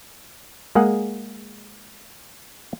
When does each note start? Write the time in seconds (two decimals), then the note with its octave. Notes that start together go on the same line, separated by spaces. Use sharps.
0.75 G#3 A#3 G#4 D#5 F#5